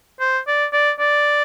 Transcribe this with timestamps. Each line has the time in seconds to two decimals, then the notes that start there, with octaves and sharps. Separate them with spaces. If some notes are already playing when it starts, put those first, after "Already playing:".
0.20 C5
0.47 D5
0.73 D5
1.00 D5